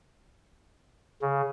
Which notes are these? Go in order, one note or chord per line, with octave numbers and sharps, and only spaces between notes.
C#3